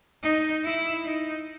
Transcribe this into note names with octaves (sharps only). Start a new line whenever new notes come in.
D#4
E4
D#4